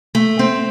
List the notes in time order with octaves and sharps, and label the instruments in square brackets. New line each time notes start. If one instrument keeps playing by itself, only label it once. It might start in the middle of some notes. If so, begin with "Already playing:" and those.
[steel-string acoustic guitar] A3
C4